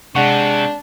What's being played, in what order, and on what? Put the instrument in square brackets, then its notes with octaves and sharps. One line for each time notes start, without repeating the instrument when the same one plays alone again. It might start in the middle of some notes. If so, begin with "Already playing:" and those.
[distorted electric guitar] C3 [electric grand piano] G#3 F#5 C#6 [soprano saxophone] D4